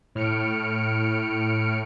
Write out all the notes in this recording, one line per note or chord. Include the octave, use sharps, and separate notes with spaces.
A2 F6 C#7 D7